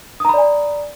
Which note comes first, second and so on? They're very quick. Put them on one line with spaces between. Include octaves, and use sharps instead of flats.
D#6 A#5 B5 D5 G#5